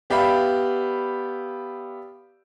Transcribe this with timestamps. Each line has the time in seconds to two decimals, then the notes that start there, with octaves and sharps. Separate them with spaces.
0.10 B3 G4 D5 E5 F5 B5